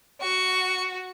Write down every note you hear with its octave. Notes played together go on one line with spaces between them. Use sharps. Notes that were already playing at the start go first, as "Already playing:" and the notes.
F#4 C#6